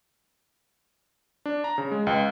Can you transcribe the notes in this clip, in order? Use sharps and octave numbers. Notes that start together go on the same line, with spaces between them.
D4
A#5
C#3
G#3
C#2